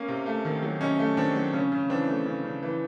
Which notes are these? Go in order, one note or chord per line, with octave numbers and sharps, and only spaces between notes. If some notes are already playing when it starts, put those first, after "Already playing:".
Already playing: A#3 C#4
C3
A3
D#3
F#3
C3 C#4 D#4
A3
D#3 C4 D4
F#3
C#3 C#4
C#3
E3 C4 D4
A3
C#3
C#3
E3